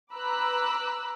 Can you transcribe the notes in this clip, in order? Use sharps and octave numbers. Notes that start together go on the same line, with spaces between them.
B4 A#5 B5 D6 E6 F#6